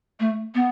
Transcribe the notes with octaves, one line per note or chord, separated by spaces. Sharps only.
A3
B3